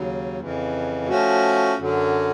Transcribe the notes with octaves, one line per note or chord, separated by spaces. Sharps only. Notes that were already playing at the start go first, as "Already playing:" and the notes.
Already playing: D#2 C#3 F#3
F2 C#3 E3
F3 A3 C#4 F#4
F#2 D3 F#3